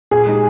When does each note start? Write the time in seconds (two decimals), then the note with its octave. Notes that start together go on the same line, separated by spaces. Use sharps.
0.11 A#2 G#4
0.27 G#3 D#4 G4